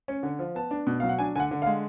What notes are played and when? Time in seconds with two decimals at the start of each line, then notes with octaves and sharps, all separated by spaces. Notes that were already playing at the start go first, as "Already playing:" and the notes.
0.08 C#4
0.23 D3
0.39 F3
0.55 B3 A5
0.71 D4
0.87 B2
1.00 F#3 F5
1.09 F#5
1.19 D4 G#5
1.36 D3 F#5 G#5
1.51 D3
1.62 F5
1.66 G#3